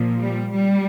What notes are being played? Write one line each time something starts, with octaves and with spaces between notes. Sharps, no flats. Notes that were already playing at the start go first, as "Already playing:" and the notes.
Already playing: A#2 F3
G3
G3